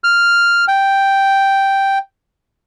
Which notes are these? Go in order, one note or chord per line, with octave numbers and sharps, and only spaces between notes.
F6
G5